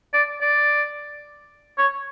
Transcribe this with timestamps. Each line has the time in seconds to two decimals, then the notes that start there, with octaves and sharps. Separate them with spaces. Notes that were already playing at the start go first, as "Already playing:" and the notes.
0.13 D5
0.41 D5
1.78 C#5